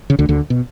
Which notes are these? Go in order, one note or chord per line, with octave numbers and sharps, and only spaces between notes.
C#3
D2 D3
D2 D3
B2